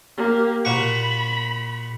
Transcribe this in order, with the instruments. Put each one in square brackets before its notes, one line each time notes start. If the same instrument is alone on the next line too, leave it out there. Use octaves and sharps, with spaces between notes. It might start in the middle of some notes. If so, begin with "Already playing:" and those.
[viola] A#3 G4
[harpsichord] A#2 F#4 C#6 [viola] B5